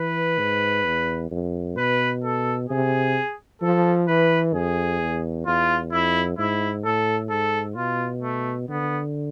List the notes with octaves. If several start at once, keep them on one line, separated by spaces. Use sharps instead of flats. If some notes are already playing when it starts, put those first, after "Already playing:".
Already playing: E3 B4
G#2
E2
F2
B2 B4
A4
C3 G#4
F3 A4
E3 B4
F2 G#4
E2
E2 F4
F2 E4
G#2 E4
A2 A4
G#2 A4
B2 F4
A3
D3 B3